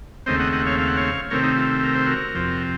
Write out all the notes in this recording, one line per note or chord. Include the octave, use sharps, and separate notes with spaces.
D#2 C#3 A3 C4 C5 D#5
D#5 F#5
D#5 F#5
C#5 F5
F5
F#5
C#5 F5
C3 D#3 A3 C4 A#4 C#5
D#4
F4
A#4
C5
F#4 A#4
F2 C3 F3 C4